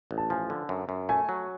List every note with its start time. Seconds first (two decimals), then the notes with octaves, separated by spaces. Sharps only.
0.11 A1
0.18 A5
0.30 F3 G#5
0.50 D3
0.69 F#2
0.89 F#2
1.09 A3 G#5
1.29 F#3